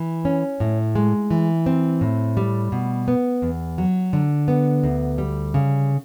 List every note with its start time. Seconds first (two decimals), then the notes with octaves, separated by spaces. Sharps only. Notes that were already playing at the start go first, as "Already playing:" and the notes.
Already playing: E3
0.25 C#4
0.60 A2
0.95 G#3
1.31 E3
1.66 C4
2.01 A2
2.37 G3
2.72 B2
3.08 B3
3.42 E2
3.78 F#3
4.13 D3
4.48 B3
4.83 D2
5.18 G3
5.54 C#3